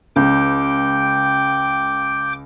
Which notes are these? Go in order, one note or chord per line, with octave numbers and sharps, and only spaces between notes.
C#2 G5 D6 G6